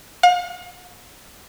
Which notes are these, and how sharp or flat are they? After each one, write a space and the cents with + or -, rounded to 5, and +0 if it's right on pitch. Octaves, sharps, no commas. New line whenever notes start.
F5 +45